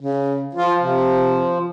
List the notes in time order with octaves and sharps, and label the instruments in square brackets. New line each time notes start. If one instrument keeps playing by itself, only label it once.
[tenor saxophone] C#3
[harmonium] F3 [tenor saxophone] F4
[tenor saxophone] C3